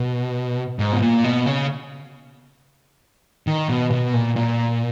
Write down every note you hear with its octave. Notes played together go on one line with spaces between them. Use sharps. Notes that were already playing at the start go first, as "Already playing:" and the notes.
Already playing: B2
G#2
B2
A#2
B2
C#3
D#3
B2
B2
A#2
A#2